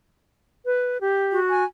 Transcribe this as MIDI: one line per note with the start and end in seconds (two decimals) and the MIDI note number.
0.65 0.98 71
1.01 1.39 67
1.32 1.63 66
1.50 1.65 80